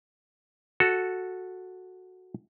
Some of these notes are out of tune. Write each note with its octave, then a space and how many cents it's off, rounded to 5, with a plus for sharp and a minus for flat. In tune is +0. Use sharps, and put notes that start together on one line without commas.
F#4 -5 A4 +0